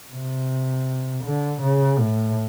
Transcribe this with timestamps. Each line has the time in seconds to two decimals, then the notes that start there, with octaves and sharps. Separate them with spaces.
0.11 C3
1.24 D3
1.62 C#3
1.99 A2